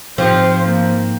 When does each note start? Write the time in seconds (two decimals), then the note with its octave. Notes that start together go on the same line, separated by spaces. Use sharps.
0.18 G#2 F3 C4 G4 C5
0.65 A#3